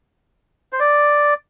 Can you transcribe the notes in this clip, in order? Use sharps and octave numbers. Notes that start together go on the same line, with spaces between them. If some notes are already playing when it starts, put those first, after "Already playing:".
C5
D5